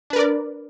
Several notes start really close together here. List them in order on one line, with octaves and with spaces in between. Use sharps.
D4 B4 A#4 D5